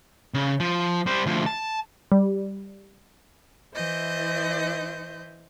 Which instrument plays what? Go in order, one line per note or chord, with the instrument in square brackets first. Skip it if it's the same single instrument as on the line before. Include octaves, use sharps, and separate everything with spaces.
[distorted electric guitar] C#3
F3
G3 C5
D2 F3
A5
[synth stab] G3
[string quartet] E3 E4 C5 D#5 G6